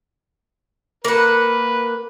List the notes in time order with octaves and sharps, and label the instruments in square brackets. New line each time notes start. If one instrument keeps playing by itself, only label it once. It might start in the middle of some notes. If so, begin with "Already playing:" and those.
[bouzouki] A#3 F#5 [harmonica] B4